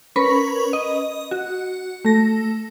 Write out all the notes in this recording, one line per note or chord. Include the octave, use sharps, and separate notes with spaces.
C#4 A#4 B4 B5 C#6
D#5
F#4
A3 A#6